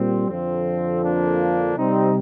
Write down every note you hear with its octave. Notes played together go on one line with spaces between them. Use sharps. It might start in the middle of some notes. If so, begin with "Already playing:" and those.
Already playing: A#2 G3 C4
F2 D3 F3 C4
A#3 D4
C3 G3 C4 D#4